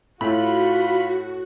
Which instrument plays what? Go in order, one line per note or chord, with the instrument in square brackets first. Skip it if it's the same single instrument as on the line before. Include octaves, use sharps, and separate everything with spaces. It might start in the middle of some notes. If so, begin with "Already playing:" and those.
[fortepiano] A2 A3 [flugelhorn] F4 [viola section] F#4 [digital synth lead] B5